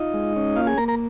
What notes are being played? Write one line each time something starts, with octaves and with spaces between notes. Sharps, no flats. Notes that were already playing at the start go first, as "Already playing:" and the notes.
Already playing: D#4 F4 D#5
G#3
C#4
A#3 F4 F5
G#4 G#5
A#3 A#4 A#5
A#4 A#5